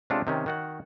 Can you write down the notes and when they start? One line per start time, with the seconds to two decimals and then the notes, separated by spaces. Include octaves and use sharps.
0.10 C3 G#3 C#4 D4 F4 A4
0.27 C3 D#3 C#4
0.46 D#3 F#4 F#5